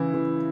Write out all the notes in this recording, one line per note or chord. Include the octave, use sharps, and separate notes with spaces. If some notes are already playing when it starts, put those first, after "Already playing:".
Already playing: C#3 E3 E4
E3